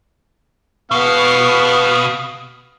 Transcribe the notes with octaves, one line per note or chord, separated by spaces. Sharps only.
B2 B3 F5